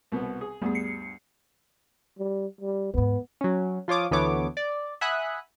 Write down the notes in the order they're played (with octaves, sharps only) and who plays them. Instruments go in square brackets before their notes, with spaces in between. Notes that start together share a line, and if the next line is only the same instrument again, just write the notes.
[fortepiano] C2 B2 B3
G#4
[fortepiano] D2 G2 [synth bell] G3 B3 G#4
[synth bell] C7 C#7
[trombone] G3
G3
[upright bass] D#2 G#2 [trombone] B3
[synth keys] F#3 C#4
F3 F4 C#5 D6 D#6
D2 E3 B3 A4 C#5 D6
D5
E5 F#5 G#5 B5 D#6 F#6